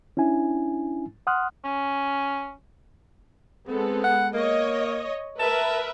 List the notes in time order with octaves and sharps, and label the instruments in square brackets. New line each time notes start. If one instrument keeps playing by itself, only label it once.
[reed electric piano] C#4 D4 E4 G#5
F#5 C6 D#6 F6 F#6
[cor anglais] C#4
[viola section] G#3 B3 A4 [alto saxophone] C4
[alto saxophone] F#5
[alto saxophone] A#3 [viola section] C#5 D#5
[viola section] A#4 B4 E5 [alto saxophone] A5